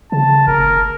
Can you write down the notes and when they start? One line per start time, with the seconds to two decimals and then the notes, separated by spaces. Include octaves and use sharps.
0.12 C#3 A5
0.47 F#1 A#4